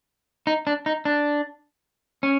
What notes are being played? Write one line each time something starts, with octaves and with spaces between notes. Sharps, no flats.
D#4
D4
D#4
D4
C#4